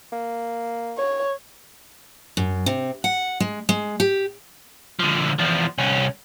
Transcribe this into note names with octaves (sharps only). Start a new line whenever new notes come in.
A#3
C#5
F#2
C3
F#5
G#3
G#3
G4
D3 F3
E2 F3
C2 C#4